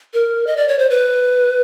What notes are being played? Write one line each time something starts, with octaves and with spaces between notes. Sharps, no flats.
A#4
D#5
D5
C#5
C5
B4